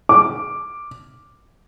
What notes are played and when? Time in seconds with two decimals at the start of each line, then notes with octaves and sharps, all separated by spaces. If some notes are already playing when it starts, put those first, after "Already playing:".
0.09 D6